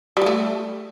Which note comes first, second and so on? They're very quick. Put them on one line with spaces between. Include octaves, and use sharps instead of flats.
G3 F3 A3